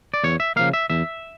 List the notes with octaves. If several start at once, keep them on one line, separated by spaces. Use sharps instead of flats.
D5
E2 C#5
E5
C#3 F3 A#3 F5
E5
E2 E5